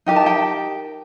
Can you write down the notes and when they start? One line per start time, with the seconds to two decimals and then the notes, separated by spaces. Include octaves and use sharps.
0.06 D#4 G4 A#4 G5
0.16 A5
0.26 G5